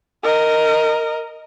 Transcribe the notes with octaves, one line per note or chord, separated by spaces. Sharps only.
A#4 D#5